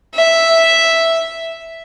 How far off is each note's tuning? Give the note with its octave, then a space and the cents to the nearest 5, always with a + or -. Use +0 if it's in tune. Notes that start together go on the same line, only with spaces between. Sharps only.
E5 +0